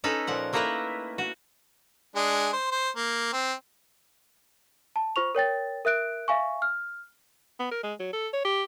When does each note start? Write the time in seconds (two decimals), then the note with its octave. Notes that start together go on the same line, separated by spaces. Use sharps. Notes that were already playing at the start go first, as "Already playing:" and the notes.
0.04 C#4 D#4 A4 B4
0.27 A#2 F3 F#5
0.53 A3 A#3 D#4 E4 A#4 B4
1.18 F#4
2.16 G#3 D4 G#4
2.53 C5
2.71 C5
2.96 A#3
3.33 C4
4.96 A5
5.16 F4 C5 C#6 F7
5.35 A#4 C#5 G5 A6
5.85 A#4 E5 F#6 D7
6.28 E5 F5 G#5 C#6
6.62 F6
7.60 B3
7.71 A#4
7.83 G#3
8.00 F#3
8.13 A4
8.33 C#5
8.45 G4